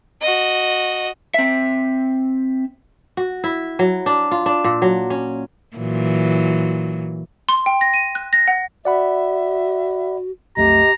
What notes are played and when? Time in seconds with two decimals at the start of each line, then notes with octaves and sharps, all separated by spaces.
0.22 F#4 D#5
1.34 C4 E5
3.17 F#4
3.44 E4
3.79 F#3
4.06 D4
4.31 F4
4.46 D4
4.64 A#2
4.82 F#3
5.10 C#4
5.77 A#2 E3 F#3
7.49 C6
7.66 G5
7.81 A#6
7.94 D#7
8.15 F#6
8.33 A#6
8.48 F#5
8.85 F#4 D5 E5 F#5 B5
10.57 B1 F2 A3 G4 D#5 A#5